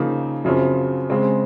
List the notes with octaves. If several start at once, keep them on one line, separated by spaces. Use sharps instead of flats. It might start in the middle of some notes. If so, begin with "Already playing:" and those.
Already playing: C#3 F3 A#3 D#4
F#2 C#3 F3 C4
C#3 G#3 C4